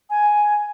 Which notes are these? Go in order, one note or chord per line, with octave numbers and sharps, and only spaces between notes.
G#5